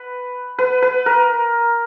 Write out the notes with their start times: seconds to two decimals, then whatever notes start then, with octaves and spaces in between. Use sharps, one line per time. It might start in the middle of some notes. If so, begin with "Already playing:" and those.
Already playing: B4
0.58 B4
0.82 B4
1.06 A#4